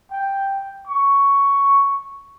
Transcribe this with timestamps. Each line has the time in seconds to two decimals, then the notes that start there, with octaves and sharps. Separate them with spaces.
0.11 G5
0.87 C#6